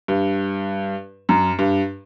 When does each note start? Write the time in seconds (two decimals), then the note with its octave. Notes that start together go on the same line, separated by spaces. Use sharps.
0.08 G2
1.29 F#2
1.59 G2